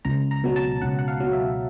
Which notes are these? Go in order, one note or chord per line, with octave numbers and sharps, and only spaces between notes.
C#2 A#5
A#5
B2 F#3
A5
C#2 F#5
F#5
F5
B2 F#3
E5